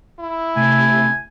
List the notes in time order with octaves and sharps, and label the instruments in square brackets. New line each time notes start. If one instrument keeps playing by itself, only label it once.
[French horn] E4
[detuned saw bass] C3 [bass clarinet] A3 [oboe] G#5